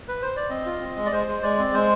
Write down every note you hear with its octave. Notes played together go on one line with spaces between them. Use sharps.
B4
C5
D5
C4 D#5
F4
C4
G#3
D5
G#3 C5
G#3
G#3 D5
C4
G#3 C5